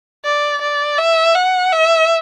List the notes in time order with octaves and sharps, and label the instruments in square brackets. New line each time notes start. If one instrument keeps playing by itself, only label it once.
[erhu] D5
D5
E5
F#5
E5